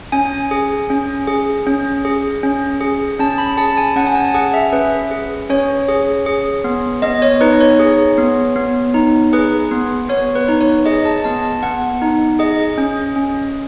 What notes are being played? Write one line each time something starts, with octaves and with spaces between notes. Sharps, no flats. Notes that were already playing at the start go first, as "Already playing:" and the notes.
C#4 G#5
G#4
C#4
G#4
C#4
G#4
C#4
G#4
C#4 A5
B5
G#4 A5
G#5
C#4 F#5
G#5
A5
G#4 F#5
E5
C#4 B4
G#4
C#4 C#5
G#4
G#4
B3
B3 D#5
C#5
D#4 B4
C#5
G#4
B3
B3
D#4
G#4 B4
B3
B3 C#5
B4
D#4
C#5
G#4 D#5
A5
B3 A5
B3 F#5
D#4
G#4 D#5
C#4
C#4